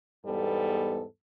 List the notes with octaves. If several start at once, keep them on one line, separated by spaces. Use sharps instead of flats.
E2 G#2 G3 B3 A4